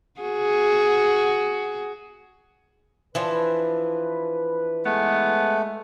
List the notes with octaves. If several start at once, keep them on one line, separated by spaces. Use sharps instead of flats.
F#4 G#4
E3 F3 D4 B4
G#3 A3 B3